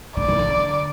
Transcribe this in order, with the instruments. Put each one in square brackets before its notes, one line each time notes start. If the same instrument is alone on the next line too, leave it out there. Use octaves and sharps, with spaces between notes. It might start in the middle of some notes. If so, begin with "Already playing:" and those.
[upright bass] D3 [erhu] D5
[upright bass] D#3
D3